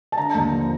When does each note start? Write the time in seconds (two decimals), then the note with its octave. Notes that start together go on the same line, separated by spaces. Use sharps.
0.12 A5
0.18 D3 A#5
0.34 D#2
0.52 F3